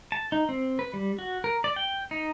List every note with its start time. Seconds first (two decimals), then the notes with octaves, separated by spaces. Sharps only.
0.12 A5
0.32 D#4
0.49 C4
0.79 B4
0.94 G3
1.19 F#4
1.44 A#4
1.64 D5
1.76 G5
2.11 D#4